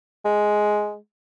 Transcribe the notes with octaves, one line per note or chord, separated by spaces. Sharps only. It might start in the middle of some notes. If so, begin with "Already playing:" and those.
G#3